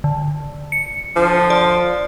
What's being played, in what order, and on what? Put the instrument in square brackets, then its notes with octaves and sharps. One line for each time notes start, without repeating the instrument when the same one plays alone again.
[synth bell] D3
C#7
[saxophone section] D3 F3
[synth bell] D5